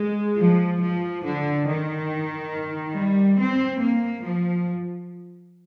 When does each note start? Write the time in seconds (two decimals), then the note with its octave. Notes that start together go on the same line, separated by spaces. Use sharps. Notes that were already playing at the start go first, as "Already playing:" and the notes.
Already playing: G#3
0.38 F3
0.81 F3
1.24 D3
1.67 D#3
2.95 G3
3.39 C4
3.81 A#3
4.24 F3